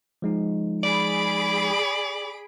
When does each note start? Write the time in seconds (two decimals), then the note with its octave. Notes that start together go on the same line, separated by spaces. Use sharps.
0.22 F3 G#3 D#4
0.83 G#4 D5 B5 D7